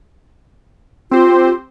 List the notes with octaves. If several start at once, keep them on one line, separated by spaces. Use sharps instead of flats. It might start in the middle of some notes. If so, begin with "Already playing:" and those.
C4 F4 G4 C5